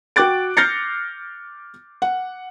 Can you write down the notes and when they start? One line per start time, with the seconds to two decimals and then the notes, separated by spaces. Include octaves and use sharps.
0.16 F#4 G5 D6 F#6 A6 D7
0.57 F6 G6 A6 A#6 C7 C#7
2.02 F#5